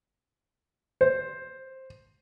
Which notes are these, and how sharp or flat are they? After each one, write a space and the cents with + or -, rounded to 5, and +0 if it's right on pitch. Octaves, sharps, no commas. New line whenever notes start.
C5 +10